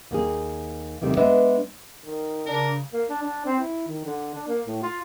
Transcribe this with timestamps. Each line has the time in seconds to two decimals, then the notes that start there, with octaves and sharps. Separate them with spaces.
0.11 D#2 A#3 G#4
1.01 E2 C3 D#3 G3 A3
1.17 G#3 B3 D4 B4 D#5 E5
2.05 D#3
2.46 C#3 D4 A#4
2.93 A#3
3.09 D4
3.23 D4
3.45 C4
3.60 E4
3.88 D#3
4.05 D3
4.34 D4
4.48 A#3
4.67 A2
4.83 F4